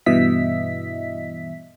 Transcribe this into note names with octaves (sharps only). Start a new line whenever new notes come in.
G2 B2 E3 D#5 E5 B6